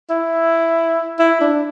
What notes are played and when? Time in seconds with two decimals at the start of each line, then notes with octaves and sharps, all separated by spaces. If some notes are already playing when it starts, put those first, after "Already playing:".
0.10 E4
1.19 E4
1.41 D4